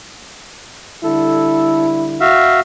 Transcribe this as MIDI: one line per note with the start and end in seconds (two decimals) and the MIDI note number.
1.04 2.33 50
1.04 2.33 55
1.04 2.33 64
1.04 1.87 69
2.20 2.60 66
2.20 2.60 76
2.20 2.60 77